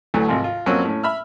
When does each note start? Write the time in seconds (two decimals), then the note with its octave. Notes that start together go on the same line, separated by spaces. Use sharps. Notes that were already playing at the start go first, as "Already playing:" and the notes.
0.14 D2 E3 F#3 A3
0.28 G#1 C3 F3
0.44 F4
0.66 F2 F#3 A#3 C4 C#4 E6
0.84 A2 C#4
1.04 E5 B5 E6 F6